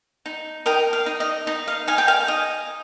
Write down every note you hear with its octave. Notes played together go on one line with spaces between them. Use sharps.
D#4
A#4 D#5 G5
F5
D#4
D#5
D#4 D#5
F5
D#4 F5 G#5
G5
F5 G#5
D#5